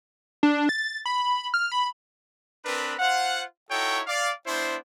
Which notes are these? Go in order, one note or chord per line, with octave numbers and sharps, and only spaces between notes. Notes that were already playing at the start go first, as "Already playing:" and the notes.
D4
A6
B5
F6
B5
C4 D4 A#4 B4
F4 C5 F5 F#5
D#4 E4 F#4 A4 C#5 G5
D5 F5
B3 D4 E4 C5